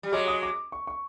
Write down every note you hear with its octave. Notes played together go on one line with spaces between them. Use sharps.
G3
F#3 G#3 D6
D#6
D6
C#6
C#6